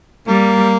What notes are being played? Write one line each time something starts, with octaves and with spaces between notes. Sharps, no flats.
G3 A#3